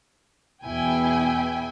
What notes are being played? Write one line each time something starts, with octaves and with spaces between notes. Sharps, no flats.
E2 B2 E4 G5 G#5